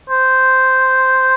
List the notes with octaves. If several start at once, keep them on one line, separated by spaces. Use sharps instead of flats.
C5